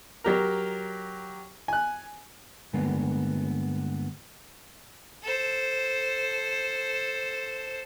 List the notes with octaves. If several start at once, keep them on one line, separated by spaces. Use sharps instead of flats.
F#3 G4 A#4
G#5 F#6
G2 D3 G#3 A#3 B3
A4 C5